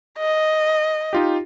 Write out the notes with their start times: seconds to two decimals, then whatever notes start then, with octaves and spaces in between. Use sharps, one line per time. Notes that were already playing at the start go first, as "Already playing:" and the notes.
0.18 D#5
1.13 D#4 F4 G4